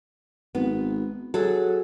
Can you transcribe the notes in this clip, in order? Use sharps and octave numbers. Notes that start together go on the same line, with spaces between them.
G#1 B3
F#3 G#4 A4